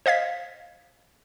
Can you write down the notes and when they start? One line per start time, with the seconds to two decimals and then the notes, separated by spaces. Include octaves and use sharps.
0.06 C5 D#5 F5 G#6 B6